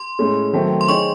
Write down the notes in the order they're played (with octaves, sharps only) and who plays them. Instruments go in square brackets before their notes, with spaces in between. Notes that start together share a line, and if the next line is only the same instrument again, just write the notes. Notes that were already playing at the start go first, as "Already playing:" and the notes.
Already playing: [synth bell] C6
[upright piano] A2 G#3 C#4
D#3 F#3 A3 C4
[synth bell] C6
[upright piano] C4 D#4 G#4 C#5 [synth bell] C#6